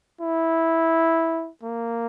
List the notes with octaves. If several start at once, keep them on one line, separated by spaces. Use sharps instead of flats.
E4
A#3